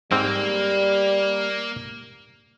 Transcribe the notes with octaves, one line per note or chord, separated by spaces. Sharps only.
G#2 G3 A#3 C4